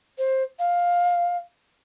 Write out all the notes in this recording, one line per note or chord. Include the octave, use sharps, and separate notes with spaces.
C5
F5